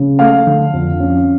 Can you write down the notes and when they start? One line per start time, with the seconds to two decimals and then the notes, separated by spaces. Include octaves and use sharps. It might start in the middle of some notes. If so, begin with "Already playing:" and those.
Already playing: C#3
0.19 A3 F5
0.47 D3
0.73 F2
1.00 C#4